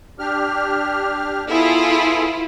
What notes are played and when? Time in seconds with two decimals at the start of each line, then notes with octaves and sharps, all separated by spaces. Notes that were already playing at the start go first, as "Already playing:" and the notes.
0.19 D4 G4 F6
1.48 B3 E4 F4 G#4 A4